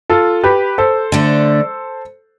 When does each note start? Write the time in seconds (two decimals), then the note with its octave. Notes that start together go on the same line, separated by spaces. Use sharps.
0.10 F4 A4
0.43 G4 B4
0.78 A4 C5
1.12 D3 A3 D4